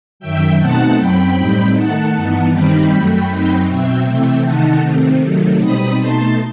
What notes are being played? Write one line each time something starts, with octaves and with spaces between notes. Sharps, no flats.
F#2 D#3 F#3 E5 G5
B2 A3 C4 D#4 F#5 A5
F#2 F#3 C4 G5 B5
A2 G3 C4 D#4
D#3 A3 D#4 F#5 A5
G2 E3 B3 D#4
G2 D#3 G3 C4 D#4 G5 B5
F#2 F#3 A3
F#2 F#3 C4 D#4
B2 F#3 C4 E5 G5
C3 E3 A3 C4 E5 G5
C3 D#3 A3 D#4 F#5 A5
C3 D#3 A3 C4
C3 D#3 F#3 A3
B2 G3 C4 D#4 B5 D#6
B2 A3 D#4 A5 C6